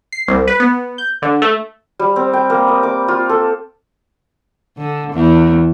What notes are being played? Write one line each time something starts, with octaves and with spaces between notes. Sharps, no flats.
C7
C2
B4
B3
G6
D3
A3
G3
C4
G5
A#3
D#6
D6
F4
A4
D3
E2